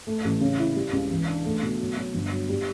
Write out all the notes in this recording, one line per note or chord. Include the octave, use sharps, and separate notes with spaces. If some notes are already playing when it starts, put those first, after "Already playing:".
A3
A1
C#3
E4
G3
C#2
E3
D4
A3
B2
F#3
F#3
G1
F#3
G3